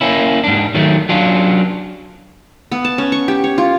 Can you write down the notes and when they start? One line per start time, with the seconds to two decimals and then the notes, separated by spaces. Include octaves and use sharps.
0.01 A#3 C#4 E4
0.44 G#2 D4
0.75 D#3 F#3 A3
1.09 F#3 C#4 D4 F4
2.72 B3
2.85 A5
2.98 C#4
3.12 C#6
3.28 G4
3.44 C#5
3.58 F4